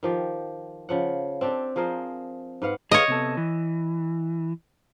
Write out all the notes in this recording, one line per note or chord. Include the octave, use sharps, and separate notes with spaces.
D#3 F3 G4
C#3 F3 F#5
C4 D4 G4 A4
F3 G#4 A#4 C5
G#2 B4 F5 F#5
G#4 B4 C#5 D#5 F5
C3 B3 A4
E3